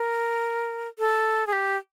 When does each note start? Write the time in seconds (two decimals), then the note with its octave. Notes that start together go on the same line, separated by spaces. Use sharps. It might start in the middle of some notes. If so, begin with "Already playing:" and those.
Already playing: A#4
0.99 A4
1.47 G#4
1.53 G4